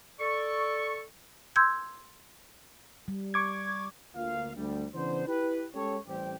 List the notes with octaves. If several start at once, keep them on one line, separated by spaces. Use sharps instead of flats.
A4 D5 C#6
C6 E6 G6 G#6
G3
C#6 D6 G#6
D2 A#3 F4 F5
D2 G3
C#3 E3 B3 D4 C5
E4 G4 B4
G#3 C#4 G4 A4 C#5
A1 G3 C4 G4